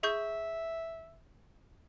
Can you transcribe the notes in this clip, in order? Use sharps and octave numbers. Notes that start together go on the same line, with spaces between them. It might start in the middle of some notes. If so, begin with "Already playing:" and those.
G#4 E5 C#6 G6